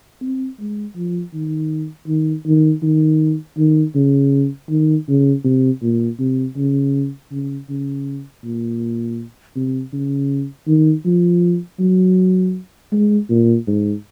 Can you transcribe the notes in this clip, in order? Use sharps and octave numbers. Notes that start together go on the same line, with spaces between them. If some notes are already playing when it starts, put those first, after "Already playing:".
C4
G#3
F3
D#3
D#3
D#3
D#3
D#3
C#3
D#3
C#3
C3
A#2
C3
C#3
C#3
C#3
A#2
C3
C#3
D#3
F3
F#3
G#3
A#2
G#2